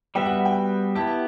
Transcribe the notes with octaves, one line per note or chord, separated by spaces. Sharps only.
G3 B3 F#4 B4 E5 G5
F#5
G5
B3 E4 G4 A5